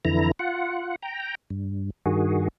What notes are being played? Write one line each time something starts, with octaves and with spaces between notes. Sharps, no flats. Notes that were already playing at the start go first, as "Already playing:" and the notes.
F2 D3 E3 E4 A#5
F4 F#5
G5 A#5
G2
G2 D#3 F#4 G#4